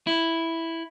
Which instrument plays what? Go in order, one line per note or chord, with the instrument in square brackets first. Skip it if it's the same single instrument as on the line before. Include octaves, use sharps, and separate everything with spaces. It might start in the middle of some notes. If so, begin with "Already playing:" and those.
[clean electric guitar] E4